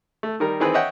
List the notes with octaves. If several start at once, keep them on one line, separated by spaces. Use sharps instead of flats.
A3
D#3 G3 A#4
D#3 E3 C4 G#4 B4
C#5 D#5 E5 F#5 G5